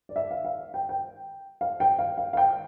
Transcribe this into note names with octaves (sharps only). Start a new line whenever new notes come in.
D5
E5
F5
F5
G5
G5
F5
G5
F5
F5
F5
G5